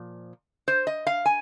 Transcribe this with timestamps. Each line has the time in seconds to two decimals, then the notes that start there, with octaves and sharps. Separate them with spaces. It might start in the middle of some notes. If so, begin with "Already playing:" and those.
Already playing: A#2 F3
0.68 C5
0.87 D#5
1.07 F5
1.26 G#5